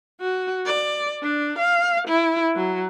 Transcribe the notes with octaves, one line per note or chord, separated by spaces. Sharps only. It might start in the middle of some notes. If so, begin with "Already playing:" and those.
F#4
D5
D4
F5
E4
F#3